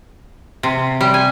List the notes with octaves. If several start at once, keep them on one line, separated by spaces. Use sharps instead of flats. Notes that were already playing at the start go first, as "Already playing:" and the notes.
C3
G3
G#5